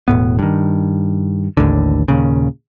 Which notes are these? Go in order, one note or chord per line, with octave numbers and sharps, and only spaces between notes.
E1 A2 B3
G2 D#3
A1 D#2 A2 D3
D#2 A#2 C#3